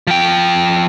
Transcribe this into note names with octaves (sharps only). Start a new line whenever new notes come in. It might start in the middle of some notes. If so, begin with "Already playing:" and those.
F3 G5